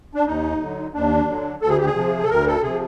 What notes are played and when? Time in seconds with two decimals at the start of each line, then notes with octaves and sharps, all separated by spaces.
0.15 D4
0.27 D#2 D#4
0.60 D3 F#3
0.94 D#2 D4
1.28 D3 F#3
1.62 D2 A4
1.69 G#4
1.77 G4
1.86 G#4
1.95 C3 F3
2.23 A4
2.29 D2 A#4
2.47 A4
2.63 C3 F3 G#4